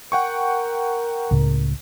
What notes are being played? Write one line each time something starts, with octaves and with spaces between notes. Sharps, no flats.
A#4 F#5 G5 C#6
C#2 A2 C#3